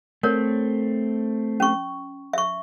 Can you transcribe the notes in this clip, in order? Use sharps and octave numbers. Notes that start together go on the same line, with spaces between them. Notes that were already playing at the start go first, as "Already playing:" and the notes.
A3 C4 A#4 C#5
C#4 C#6
E5 C#6